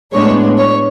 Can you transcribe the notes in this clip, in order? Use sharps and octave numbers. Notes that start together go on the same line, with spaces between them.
A2 G#3 B3 D4 C#5
C#5